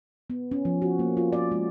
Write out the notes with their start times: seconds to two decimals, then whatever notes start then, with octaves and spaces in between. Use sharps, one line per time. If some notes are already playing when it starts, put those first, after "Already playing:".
0.30 B3
0.51 C#4
0.65 F3
0.82 F#4
0.99 A#3
1.17 F4
1.32 D5
1.51 G#3